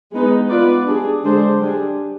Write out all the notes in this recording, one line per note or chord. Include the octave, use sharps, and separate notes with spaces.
G#3 B3 D#4 B4
B3 F4 B4 D5
G3 D4 G#4
D3 G#3 D4 G#4 C5
G3 D4 G#4